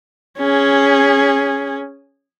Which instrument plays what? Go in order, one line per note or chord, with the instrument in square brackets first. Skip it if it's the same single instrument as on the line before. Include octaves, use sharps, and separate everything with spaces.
[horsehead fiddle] C#4 G#4